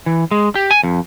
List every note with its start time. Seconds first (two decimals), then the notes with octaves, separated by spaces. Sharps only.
0.06 E3
0.31 G#3
0.55 G4
0.71 G#5
0.84 F2